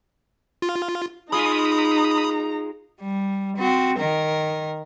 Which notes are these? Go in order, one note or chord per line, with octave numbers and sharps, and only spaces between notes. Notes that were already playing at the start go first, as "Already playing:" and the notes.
F4
G#3 D#4 F4 A#5 B5 D#6
G3
C4 F#4
D#3 A#4